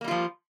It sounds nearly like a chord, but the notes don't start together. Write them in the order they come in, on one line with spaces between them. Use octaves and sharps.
A#3 G3 F4 F3